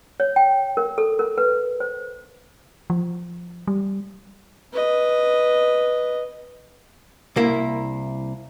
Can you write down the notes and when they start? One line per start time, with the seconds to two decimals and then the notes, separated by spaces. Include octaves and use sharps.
0.20 C#5
0.36 G5
0.77 A#4
0.98 A4
1.19 A#4
1.38 B4
1.80 C5
2.90 F3
3.68 G3
4.72 B4 D#5
7.36 C2 A#3 E4